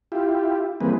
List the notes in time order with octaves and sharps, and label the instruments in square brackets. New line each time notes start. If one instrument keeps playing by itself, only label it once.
[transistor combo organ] E4 F4 G4
E3 G3 A#3 C4 G#4 B4